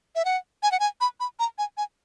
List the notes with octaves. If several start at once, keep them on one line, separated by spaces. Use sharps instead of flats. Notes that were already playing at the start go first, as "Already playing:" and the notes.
E5
F#5
G#5
F#5
G#5
B5
B5
A#5
G#5
G#5